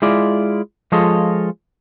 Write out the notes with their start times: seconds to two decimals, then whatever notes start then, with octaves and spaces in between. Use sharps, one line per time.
0.02 G#3 E4 F4 D5
0.92 F3 G#3 F4 A4 C#5 D#5